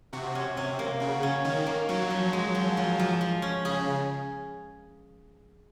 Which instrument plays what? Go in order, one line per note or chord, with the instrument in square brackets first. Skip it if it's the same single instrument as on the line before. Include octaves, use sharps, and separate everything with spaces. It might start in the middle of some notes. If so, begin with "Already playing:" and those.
[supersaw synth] C3 [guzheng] F#4
[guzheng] C#4
[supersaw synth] C3 [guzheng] C#4
[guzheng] A#3
[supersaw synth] C#3 [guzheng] F#4
[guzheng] C#4
[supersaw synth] D#3 [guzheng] C#4
[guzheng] A#3
[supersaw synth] F#3 [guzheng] C#4
[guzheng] F3
G#3
F3
F3
F3
F3
C#4
[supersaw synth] C#3 [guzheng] G#4